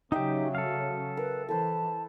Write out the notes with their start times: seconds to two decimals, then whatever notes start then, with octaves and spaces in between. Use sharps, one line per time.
0.12 C#3 F#3 D#4 G4 E5 G5
0.55 A4 F5
1.17 A#4 B4
1.49 E3 A4 B4 C5 A5